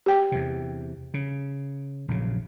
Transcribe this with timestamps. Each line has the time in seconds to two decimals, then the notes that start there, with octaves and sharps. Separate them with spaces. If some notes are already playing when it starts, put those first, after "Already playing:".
0.06 G4 G5
0.32 E2 C3
1.14 C#3
2.08 A#1 F#2 C#3